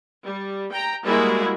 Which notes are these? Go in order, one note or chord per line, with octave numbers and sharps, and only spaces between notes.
G3
G5 A#5
G3 G#3 A#3 E4 F#4 G#4